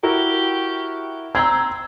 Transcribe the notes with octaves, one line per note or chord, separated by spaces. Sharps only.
E4 F#4 G4 A#4
C4 A#5 E6 G#6